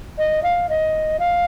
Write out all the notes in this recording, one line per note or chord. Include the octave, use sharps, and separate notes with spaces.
D#5
F5
D#5
F5